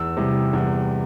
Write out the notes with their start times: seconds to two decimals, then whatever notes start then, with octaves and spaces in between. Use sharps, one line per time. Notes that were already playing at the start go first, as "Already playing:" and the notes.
Already playing: E2 E6
0.17 C3 E3 G3
0.53 E2